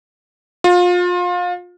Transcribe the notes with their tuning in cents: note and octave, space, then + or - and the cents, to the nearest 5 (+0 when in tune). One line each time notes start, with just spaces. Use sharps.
F4 +30